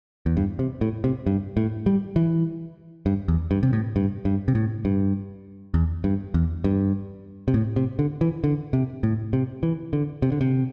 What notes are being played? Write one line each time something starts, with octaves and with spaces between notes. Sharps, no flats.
E2
G2
C3
A2
C3
G2
A2
G3
E3
G2
E2
G2
C3
A2
G2
G2
C3
A2
G2
E2
G2
E2
G2
C3
A2
C3
D3
E3
D3
C3
A2
C3
E3
D3
C3
D3
C3